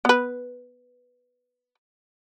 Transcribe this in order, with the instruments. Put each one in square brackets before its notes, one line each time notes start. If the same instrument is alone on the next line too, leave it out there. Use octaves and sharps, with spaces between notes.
[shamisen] B3 B4